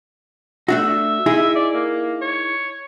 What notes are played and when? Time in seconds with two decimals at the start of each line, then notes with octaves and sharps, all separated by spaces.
0.68 A3 D4 F#4 E5
1.26 D#4 E4 G#4
1.55 D5
1.74 A#3
2.21 C#5